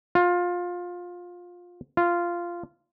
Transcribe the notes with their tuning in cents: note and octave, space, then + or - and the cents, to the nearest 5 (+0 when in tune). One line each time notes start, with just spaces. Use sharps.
F4 +20
F4 -10